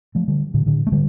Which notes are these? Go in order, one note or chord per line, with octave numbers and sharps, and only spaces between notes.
F3 A3
D3 G3
A2 D3
A2 D3
A3
D3 G3